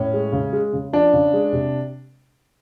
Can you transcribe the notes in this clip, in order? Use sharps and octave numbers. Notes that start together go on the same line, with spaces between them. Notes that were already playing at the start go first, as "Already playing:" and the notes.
Already playing: A2 C#4
G#3
C#3
G#3
C#3
F3 D4
C#3
G#3
C3